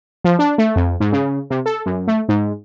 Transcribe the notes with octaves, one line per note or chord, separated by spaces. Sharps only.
F3
D4
A3
F2
G#2
C#3
C3
A4
F#2
A3
G#2